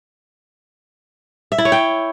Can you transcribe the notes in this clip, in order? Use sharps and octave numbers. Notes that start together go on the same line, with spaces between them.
E5
E4
C#5
G5